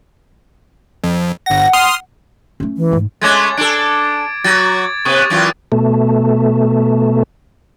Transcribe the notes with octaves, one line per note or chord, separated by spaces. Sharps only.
F2
G1 F#5 A#6
C6 D#6 F6
A3 C#4
E3
G#2 A3
G#3 A3 C#4 D6 G#6 A6
D4 A4 D7
F#3 F#4 G#6 A6
C3 B3 C#6 D#6
F#2 E3 F4
B2 A3